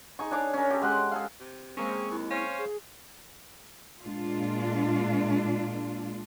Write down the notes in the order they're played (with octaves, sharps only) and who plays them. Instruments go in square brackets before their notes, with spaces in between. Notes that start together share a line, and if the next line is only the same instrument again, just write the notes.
[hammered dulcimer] D#4 G#4 C#6
D4 G#4 C#5 D6
C#4 A#4
G4 A4
G#3 G4 F#5 C6
G#4 A4 F5
[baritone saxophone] C3
[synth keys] G#3 A#3 C4 [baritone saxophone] C#4 [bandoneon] G#4 C#6
[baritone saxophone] D#2 [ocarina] E4
[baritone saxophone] C#4 [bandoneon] C5 C#5 F5
[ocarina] G#4
[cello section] A#2 G#3 D4 F4